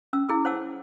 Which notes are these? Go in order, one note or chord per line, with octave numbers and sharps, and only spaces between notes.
C#4 E6
E4 G#4 E6
C5 C#5 F#5 A5 D6 E6